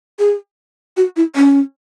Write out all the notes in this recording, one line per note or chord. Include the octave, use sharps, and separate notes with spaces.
G#4
F#4
E4
C#4